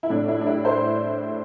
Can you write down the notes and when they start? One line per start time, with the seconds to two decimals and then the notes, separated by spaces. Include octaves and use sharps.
0.03 E4
0.10 A2 D4
0.28 E4
0.41 D4
0.46 G3 E4
0.65 C5